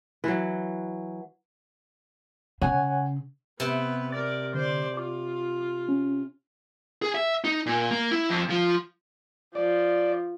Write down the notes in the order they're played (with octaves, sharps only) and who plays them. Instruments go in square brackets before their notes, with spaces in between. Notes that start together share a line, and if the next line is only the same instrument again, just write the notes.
[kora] E3 F#3
[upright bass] C#3 [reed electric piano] C#5 F#5 G#5
[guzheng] C3 [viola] B3 B4
[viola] A#4 D5 [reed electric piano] A6
[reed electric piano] D3 [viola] C5 D5
[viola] F4 [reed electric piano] D6
[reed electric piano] C#4
[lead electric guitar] G#4
E5
D#4
A#2
A#3
E4
F2
F3
[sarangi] F3 [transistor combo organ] D5